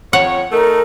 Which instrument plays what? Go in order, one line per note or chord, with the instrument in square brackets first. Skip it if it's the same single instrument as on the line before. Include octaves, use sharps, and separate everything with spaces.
[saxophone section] F2 C#5 [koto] F#5
[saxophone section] A3 D#4 A4 [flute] A#4